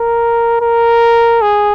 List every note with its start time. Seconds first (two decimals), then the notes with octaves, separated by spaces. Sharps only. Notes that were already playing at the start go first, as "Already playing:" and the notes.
Already playing: A#4
0.61 A#4
1.41 G#4